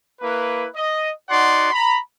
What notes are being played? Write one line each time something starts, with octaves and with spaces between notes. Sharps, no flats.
A#3 E4 B4
D#5
D#4 F#4 D5 F#5 C6
A#5 B5